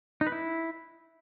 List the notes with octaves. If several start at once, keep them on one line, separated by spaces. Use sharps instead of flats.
D#4
B4
E4